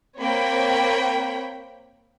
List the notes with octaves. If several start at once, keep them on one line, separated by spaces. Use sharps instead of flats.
A#3 C4 C#5 G5 B5